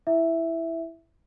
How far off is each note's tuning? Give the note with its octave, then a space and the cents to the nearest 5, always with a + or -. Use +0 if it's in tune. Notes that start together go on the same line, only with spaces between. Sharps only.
E4 +0 E5 +0